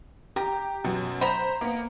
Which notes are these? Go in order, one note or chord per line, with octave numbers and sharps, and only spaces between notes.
G4 A#5
F#2 B2
C5 A#5 B5
A#3 B3